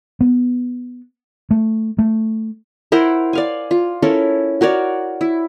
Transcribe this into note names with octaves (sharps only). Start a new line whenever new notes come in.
B3
A3
A3
E4 A#4 C5 F#5
D5 F5 G#5
F4
C#4 E4 A4 A#4
F#4 A#4 C#5 D5
E4